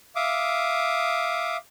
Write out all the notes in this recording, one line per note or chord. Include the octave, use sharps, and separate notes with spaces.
E5 F5 D6 D#6